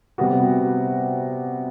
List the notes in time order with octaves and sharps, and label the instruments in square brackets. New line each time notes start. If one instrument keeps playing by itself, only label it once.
[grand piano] C3 G3 B3 F#4